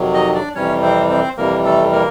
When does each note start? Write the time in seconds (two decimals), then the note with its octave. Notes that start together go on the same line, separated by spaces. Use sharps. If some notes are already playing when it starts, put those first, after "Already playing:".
Already playing: F2 C3 D#3 F#3
0.14 D#4 D#5
0.34 D4 D5
0.55 F2 C3 E3 G3 C#4 C#5
0.82 C4 C5
1.10 C4 C5
1.37 F2 C3 E3 G3 A#3 A#4
1.65 A3 A4
1.92 A#3 A#4